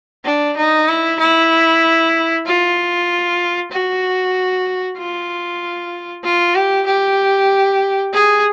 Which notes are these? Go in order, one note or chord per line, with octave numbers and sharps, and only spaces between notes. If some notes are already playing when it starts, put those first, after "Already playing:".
D4
D#4
E4
E4
F4
F#4
F4
F4
G4
G4
G#4